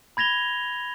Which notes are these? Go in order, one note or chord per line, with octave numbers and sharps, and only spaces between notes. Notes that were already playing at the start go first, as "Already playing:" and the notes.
B5 G#6 A#6 F7 G7